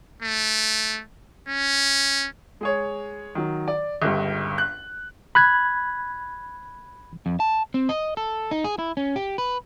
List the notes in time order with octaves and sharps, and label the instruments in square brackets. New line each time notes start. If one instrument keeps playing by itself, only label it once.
[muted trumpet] A3
C#4
[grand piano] G#3 G#4 C#5
D#3 F#3
D5
G1 C#2 G2
F#6
[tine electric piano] B5 F#6 G#6
[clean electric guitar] F2
A5
C4
D#5
A4
D#4
G#4
E4
C#4
G4
B4